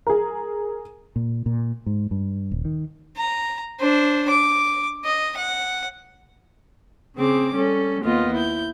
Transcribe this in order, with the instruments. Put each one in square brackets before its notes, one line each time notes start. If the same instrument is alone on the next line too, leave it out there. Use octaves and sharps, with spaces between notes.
[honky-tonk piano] G#4 A#4
[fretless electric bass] A#2
A#2
G#2
G2
D#1
D#3
[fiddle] A#5
D4 C5
D6
D#5
F#5
[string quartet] C#3 C4 G#4 D6
G3 C#4 A4
D#2 A#3 B3 F4 D#5
E4 G6